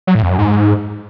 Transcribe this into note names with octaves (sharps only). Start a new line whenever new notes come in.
F#3
A2
F2
F#2
G#2